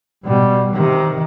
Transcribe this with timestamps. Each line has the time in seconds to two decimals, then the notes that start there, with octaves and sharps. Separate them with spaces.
0.24 B2 G3
0.73 C3 D#3